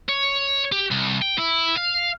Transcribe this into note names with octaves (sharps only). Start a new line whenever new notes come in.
C#5
G4
C2
G5
E4
F5